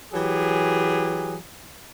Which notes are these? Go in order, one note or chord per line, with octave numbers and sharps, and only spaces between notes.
E3 F#3 G4 G#4